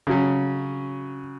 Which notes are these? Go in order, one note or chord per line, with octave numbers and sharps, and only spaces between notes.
C#3 F#3 C#4